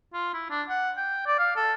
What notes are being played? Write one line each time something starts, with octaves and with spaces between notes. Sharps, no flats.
F4
E4
D4
F#5
G5
D5
F5
A4